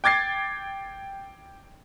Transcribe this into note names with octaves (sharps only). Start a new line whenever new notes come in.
G5 D6 G#6 A6 C7